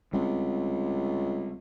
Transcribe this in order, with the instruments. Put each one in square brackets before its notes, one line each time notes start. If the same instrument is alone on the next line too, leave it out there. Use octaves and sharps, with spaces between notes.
[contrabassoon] C#2 [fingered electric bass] G3 C4